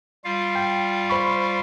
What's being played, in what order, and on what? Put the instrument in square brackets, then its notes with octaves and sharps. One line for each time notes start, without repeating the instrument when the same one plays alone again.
[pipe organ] G3 F4 F5
[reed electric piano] G5
C5 B5 C#6